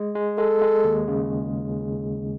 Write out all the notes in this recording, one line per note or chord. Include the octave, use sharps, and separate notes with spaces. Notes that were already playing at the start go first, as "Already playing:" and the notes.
Already playing: G#3
G#3
G#3 A4
G#3
D#2
C#3